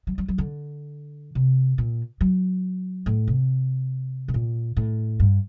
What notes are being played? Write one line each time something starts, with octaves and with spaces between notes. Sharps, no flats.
F#3
F#3
F#3
D3
C3
A#2
F#3
A2
C3
A2
A#2
A2
G2